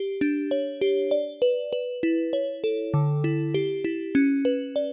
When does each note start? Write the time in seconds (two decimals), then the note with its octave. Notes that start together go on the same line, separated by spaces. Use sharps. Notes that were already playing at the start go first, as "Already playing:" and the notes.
Already playing: G4
0.21 D4
0.51 C#5
0.81 G4
1.11 D5
1.42 B4
1.73 B4
2.03 E4
2.33 C#5
2.64 A4
2.94 D3
3.24 E4
3.54 G4
3.84 E4
4.15 C#4
4.45 B4
4.76 D5